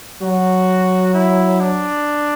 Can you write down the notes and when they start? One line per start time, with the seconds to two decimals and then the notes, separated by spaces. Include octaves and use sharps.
0.22 F#3 F#4
1.14 E4
1.60 D4